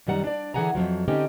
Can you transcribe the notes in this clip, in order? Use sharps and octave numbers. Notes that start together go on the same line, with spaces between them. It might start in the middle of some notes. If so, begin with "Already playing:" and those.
F#2 D#3 G3 F#5 A#5
D4 D5
D3 E3 G#4 F#5 G#5 A#5
F2 A#2 F3 F#3
D3 C4 C#4 D#4 G4